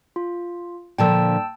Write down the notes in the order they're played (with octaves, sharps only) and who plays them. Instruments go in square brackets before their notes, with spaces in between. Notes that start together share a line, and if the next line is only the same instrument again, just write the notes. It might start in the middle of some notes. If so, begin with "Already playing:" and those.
[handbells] F4
[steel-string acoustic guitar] A#2 D3 F3 [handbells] G5 A5 E6